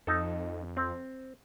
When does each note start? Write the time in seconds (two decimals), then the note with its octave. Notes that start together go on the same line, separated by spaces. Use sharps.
0.07 F2 D#4 A4
0.77 C4